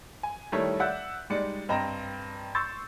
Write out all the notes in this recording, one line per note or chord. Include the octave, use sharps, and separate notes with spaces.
G#5
D#3 G3 A3 E4 C#5
D5 E5 F#5 E6 F#6 G6
G3 G#3 D#4 D5 C#7
G2 C4 D#5 G5 A#5 E7
C6 C#6 E6 G6 A6